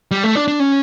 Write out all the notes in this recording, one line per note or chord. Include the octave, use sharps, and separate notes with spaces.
G3
A3
D4
D4
C#4